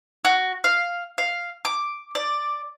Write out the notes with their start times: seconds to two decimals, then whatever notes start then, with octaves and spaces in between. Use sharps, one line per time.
0.25 F#4
0.64 F5
1.18 F5
1.65 D6
2.15 D5